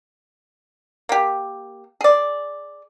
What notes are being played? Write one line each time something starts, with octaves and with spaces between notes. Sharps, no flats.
A#3 G4
G#4 D5